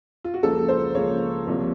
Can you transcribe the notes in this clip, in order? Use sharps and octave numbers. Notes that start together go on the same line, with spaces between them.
F4
F#4
C#2 C#3 F3 A#3 A4
C5
C#2 C#3 F3 A#3 C#5
C2 C3 F3 A#3